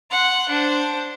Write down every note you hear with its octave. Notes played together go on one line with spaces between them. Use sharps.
F#5 C6
D4 C5